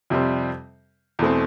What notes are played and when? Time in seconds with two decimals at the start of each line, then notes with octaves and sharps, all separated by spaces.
0.10 F2 C3 G3 C4
1.19 E2 B2 A3 C4